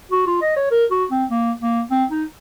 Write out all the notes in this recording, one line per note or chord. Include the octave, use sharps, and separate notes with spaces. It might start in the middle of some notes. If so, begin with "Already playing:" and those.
F#4
F4
D#5
C#5
A#4
F#4
C4
A#3
A#3
C4
D#4